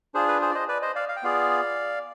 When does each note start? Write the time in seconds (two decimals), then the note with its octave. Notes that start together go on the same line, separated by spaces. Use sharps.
0.14 D4 F4 G#4 C5
0.28 B4
0.42 G#4 C5
0.51 D5
0.55 C5 D#5
0.68 B4 D5
0.82 C5 D#5
0.96 D5 F5
1.09 F5
1.16 G5
1.23 B3 F4 G#4 D5 F5